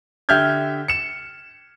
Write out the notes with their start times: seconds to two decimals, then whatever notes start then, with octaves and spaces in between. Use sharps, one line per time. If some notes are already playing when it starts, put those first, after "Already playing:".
0.29 D3 G4 E5 F6 G6 G#6
0.88 C#7 E7